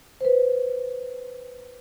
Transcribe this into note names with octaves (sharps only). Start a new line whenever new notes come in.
B4 C5